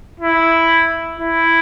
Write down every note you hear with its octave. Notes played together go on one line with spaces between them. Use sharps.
E4
E4